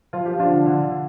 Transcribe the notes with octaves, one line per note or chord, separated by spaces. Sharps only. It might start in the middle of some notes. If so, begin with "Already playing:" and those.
F3 F4
G4
F3
D4 F4
D3
D3
D3